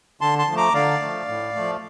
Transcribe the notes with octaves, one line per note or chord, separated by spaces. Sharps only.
D3 A5 C6
A5 C6
F3 A3
A#5 D6
D3 D5 F5
F3 A3
A2
F3 A3